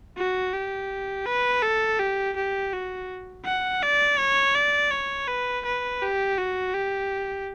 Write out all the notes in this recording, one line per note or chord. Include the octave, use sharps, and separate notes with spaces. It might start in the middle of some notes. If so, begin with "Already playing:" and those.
F#4
G4
B4
A4
G4
G4
F#4
F#5
D5
C#5
D5
C#5
B4
B4
G4
F#4
G4